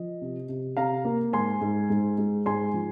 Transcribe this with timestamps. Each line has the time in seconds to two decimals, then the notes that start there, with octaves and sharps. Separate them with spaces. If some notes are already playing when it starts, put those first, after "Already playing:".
Already playing: F3 D#5
0.21 C3
0.49 C3
0.77 C3 F5 A#5
1.05 A#3
1.33 G#2 G#5 C6
1.61 G#2
1.90 G#2
2.18 G#3
2.46 G#2 G#5 C6
2.74 F3